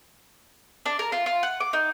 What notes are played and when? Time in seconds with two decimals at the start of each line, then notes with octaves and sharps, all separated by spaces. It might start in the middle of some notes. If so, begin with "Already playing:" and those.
0.86 D4
0.99 A#4
1.12 F4
1.26 F4
1.43 F#5
1.60 D6
1.73 D#4